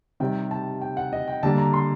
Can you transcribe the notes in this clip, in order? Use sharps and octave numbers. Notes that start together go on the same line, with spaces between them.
C3 D#3 G3 G5
A5
G5
F#5
D#5
G5
D3 G3 A#3 A5
A#5
C6